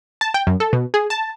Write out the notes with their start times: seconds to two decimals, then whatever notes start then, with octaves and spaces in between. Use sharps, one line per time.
0.21 A5
0.34 G5
0.47 F#2
0.60 A4
0.73 B2
0.94 G#4
1.10 A5